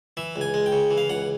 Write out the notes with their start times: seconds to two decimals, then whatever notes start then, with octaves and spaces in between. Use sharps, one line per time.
0.17 E3 E5
0.36 C#2
0.41 G#5
0.54 G#3
0.66 G5
0.72 C#3
0.91 E3
0.98 F5
1.09 C#2 F#5